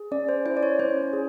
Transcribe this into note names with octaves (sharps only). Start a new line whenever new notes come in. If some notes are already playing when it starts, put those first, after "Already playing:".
Already playing: G#4
C#4 D5
C5
E4 C5
D5
C#5
C#4 C5
G#4